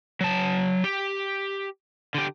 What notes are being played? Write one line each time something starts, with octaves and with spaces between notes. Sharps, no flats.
F#3 A5
G4
D3 G4